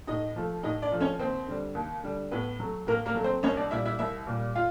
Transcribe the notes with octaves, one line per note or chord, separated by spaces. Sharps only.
A2 D#4 D#5
F3 A3
A2 D#4 D#5
D4 D5
F3 A3
C#4 C#5
D#2 C4 C5
D3 G3
D#2
D3 G3
A2 B3 B4
F#3 A3
A2 A#3 A#4
A#3 A#4
F#3 A3
C4 C5
C2 C#4 C#5
D4 D5
A#2 G3 E4 E5
E4 E5
C2 E4 E5
A#2 G3
F4 F5